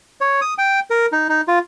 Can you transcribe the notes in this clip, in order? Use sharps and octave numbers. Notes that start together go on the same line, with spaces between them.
C#5
D#6
G5
A#4
D#4
D#4
F4